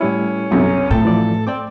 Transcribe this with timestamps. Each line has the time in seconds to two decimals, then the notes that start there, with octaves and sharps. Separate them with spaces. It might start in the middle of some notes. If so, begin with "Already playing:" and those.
0.01 A2 G3 C#4 E4
0.51 B1 F#2 C3
0.91 A2 A4 G5
1.05 E3 F3 D5
1.47 C4 D5 G5 D6